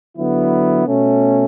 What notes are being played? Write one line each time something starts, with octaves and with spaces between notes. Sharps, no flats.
D3 F#3 B3 E4
B2 A3 C#4